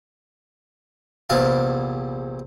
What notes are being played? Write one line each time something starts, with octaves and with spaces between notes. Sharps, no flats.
A#1 E2 C3 F5 A5